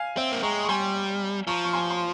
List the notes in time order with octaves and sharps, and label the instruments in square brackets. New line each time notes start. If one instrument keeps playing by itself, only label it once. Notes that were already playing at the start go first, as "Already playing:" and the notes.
Already playing: [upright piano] F5 G#5
[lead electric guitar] C4 [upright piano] E5 G5
[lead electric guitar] A#3
[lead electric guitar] G#3 [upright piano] A#5 C#6
[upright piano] C#6
[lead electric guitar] G3 [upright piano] G#5 C6
[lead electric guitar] F3 [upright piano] A#5 C#6
[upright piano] C#6
G#5 C6
C6